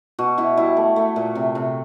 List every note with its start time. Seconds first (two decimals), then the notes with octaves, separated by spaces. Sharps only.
0.19 B2 F#4
0.38 B2 E4
0.57 G3 E4
0.77 A3
0.96 A3
1.16 A#2
1.35 C3
1.55 C3